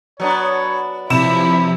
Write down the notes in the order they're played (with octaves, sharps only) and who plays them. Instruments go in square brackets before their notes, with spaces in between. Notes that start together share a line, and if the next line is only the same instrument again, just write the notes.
[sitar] F#3 B3 D4 [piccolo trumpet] C#5
[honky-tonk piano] C3 E7 [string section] F3 E4 [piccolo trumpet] B5